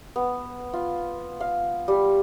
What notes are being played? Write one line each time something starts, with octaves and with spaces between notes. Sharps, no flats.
B3
F4
F5
G3